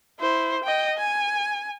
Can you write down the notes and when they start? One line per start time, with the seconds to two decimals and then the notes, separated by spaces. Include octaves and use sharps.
0.20 E4 C5
0.64 D#5 G5
0.98 G#5